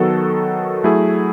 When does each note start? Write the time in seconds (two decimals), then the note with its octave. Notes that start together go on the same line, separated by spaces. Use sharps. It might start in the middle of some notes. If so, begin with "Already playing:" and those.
Already playing: D#3 F#3 B3 F#4 A4
0.84 F#3 A3 E4 G#4